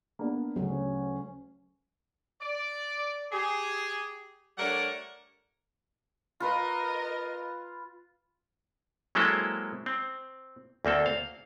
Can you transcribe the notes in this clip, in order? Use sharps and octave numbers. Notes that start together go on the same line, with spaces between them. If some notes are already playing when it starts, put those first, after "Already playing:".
A#3 B3 D4
D2 C#3 F#3 C#4
D5
G4 G#4
G3 A3 D4 A#4 C#5 F#5
F4 A#4 B4 D#5
F#3 G#3 A#3 C4 E4 A4
C4
D2 A#3 C4 A4
F5